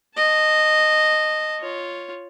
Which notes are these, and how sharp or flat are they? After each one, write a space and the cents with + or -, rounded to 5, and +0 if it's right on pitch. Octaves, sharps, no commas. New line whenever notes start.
D#5 -10 A5 +0
F4 +0 C#5 +0